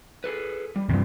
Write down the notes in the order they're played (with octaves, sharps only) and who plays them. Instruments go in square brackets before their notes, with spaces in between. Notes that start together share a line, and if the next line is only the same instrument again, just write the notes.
[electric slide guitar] G#4 A4 B4
G3
[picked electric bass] G2 C3 [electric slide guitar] D#3 F3